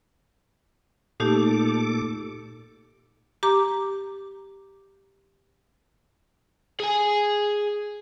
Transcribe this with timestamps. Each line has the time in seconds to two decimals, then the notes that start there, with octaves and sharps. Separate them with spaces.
1.20 A#2 A3 D#4 G4 A4 D6
3.43 G4 A#5 D6
6.80 G#4 G#5